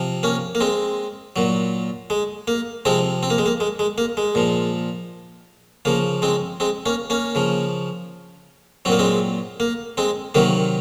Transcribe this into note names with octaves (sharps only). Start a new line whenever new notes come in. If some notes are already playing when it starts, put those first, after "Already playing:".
Already playing: C3 F3
A#3 C#4
A#3
G#3 C4
A#2 F#3
G#3
A#3
C3 F3 G#3 C4
C4
A#3
G#3
A#3
G#3
G#3
A#3
G#3
A#2 F3
C#3 F3 A#3
G#3 C4
G#3 C4
A#3 C#4
A#3 C#4
C#3 F3
A#2 F#3 A#3 C4
G#3 C4
A#3
G#3 C4
C3 D#3 F#3 A#3